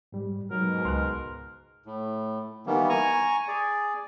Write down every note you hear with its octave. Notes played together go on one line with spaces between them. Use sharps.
G#2 G3
G#2 B2 F#3 A#4
C#2 C6 F6 F#6
A2
D#3 E3 G3 A#3 B3
G#5 A#5 C#6
G#4 D5